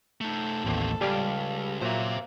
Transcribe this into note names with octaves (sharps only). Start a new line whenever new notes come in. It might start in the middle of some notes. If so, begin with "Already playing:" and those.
A3 D#4 A4
A1 D#2 A#3 C4
C#2 G3 G4 D5 F5 G#5
A#2 F#3 A#3 C5 E5 A#5